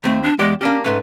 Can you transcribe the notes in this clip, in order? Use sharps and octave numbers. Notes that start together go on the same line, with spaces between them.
D#2 A3 C4
D4
E2 G#3 G4 D5
A#3 C#4 D4 G4
G#2 A3 C#4 B4